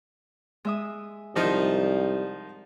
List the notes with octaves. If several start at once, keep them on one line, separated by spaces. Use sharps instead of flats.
G#3 E5 D#6
C2 D#3 F3 D#4